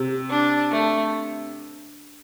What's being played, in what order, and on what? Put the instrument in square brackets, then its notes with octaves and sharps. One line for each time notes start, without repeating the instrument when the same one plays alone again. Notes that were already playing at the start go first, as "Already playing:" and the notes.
Already playing: [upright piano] C3
[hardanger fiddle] D4
A3